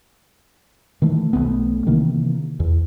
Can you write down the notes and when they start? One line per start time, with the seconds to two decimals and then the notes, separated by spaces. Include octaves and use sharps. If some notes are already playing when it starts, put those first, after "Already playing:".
1.02 D#3 E3 A3
1.33 B1 F2 A3 B3
1.86 C3 D#3 E3 A#3
2.60 E2